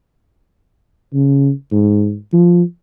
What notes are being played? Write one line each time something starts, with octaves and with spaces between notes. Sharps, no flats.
C#3
G#2
F3